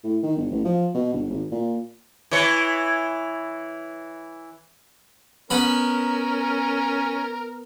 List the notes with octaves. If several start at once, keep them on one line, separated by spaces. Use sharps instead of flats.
A2
D#3
G1
A1
F3
B2
G1
G#1
A#2
E3 C#5
B3 C#4 A#4 B5